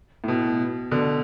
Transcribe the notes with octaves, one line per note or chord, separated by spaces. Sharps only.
A2
B2
B2 D3